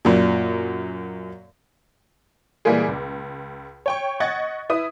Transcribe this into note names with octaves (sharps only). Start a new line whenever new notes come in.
F#2 A#2
A#2 E3 G3 G#3 A#3 G#4
C#2
C#5 G5 C#6
D#5 F#5 C#6 G#6 A6
E4 B4 D#6